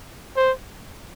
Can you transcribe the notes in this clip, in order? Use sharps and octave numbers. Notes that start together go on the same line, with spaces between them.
C5